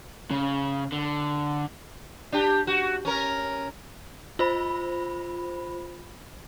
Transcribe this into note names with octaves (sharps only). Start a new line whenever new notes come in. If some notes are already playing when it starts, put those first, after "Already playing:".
C#3
D3
D4 G4
F#4
C#4 A#4
F4 C5 B5